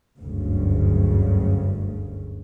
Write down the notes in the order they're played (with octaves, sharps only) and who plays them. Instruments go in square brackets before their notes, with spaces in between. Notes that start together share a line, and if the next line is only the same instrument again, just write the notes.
[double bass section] F#1 D2 G2 C#3